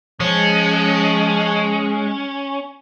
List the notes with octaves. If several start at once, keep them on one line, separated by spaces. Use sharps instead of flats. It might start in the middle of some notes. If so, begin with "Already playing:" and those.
F3 G#3 C#4